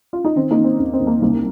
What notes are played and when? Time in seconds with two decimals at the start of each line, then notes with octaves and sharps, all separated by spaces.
0.13 F4
0.25 D#4
0.36 D#3 C4
0.51 A#3 D#4
0.57 D#3
0.64 C4
0.79 D#2 C4
0.93 C4
1.00 D#2
1.07 A#3
1.21 C2 A#3